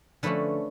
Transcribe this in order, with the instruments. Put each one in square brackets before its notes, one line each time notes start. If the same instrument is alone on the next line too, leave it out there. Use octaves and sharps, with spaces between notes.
[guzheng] D3 F3 A3 C#4 A4 B4